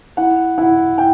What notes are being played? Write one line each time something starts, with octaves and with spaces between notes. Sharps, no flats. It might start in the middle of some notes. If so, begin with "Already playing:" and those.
E4 F#5
E4 F#5
E4 G5